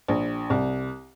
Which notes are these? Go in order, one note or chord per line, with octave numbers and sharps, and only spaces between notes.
A#1
C2